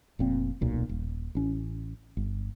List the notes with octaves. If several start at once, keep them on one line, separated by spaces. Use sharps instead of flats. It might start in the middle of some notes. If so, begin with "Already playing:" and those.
F1 A#2 C4
D1 B1 A#2
D#1
A1 C#4
G1